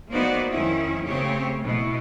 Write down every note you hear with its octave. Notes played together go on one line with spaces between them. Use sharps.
A#3 B3 D#4 F#4 C5 D5
F2 D#3 C#4 E4
C#3 A3 C4 G4 C#5
B2 E4